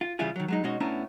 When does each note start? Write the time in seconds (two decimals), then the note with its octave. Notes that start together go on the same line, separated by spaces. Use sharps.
0.01 F4
0.19 C#3 E3 G3 E4 F4 G#4
0.36 D#3 F#3
0.48 F#3 G#3 D#4
0.64 B2 G#3 C#4 D#4 F#4 D#5
0.80 A2 B3 C#4 D4 E4 A#5